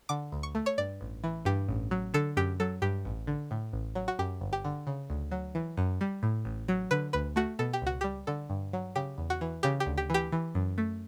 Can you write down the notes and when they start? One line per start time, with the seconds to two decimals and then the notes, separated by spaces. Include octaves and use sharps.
0.09 D3 D6
0.32 D2
0.43 C#6
0.55 A3
0.66 C#5
0.78 G2 D5
1.01 A1
1.24 E3
1.45 G2 G4
1.69 A1
1.91 F#3
2.14 D3 A4
2.37 F#2 G4
2.60 F#3 A4
2.82 G2 G4
3.05 A1
3.27 D3
3.51 A2
3.73 A1
3.95 F#3
4.08 F#4
4.19 F#2 G4
4.41 G1
4.53 G4
4.65 D3
4.87 C#3
5.10 D2
5.31 F#3
5.55 E3
5.77 F#2
6.01 G3
6.23 A2
6.45 A1
6.68 F#3
6.91 D3 B4
7.13 D2 B4
7.36 A3 F#4
7.59 B2 A4
7.73 G4
7.82 C#2 F#4
8.01 G3 G4
8.27 D3 A4
8.50 G2
8.73 F#3
8.96 C#3 G4
9.18 E2
9.30 F#4
9.41 E3
9.63 C#3 G4
9.80 G4
9.86 D2
9.98 G4
10.10 E3 G4
10.32 E3
10.55 F#2
10.78 A3